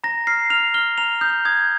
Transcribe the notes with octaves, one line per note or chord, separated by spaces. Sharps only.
A#5 A#6
F6 C7
F6 F7
F6 G7
A#5 F7
D#6 G6
D#6 G#6